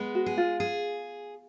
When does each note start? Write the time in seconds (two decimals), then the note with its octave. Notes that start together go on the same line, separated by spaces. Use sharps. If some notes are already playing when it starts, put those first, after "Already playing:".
Already playing: G#3 B3
0.15 F#4
0.26 G#4
0.37 F4
0.60 G#4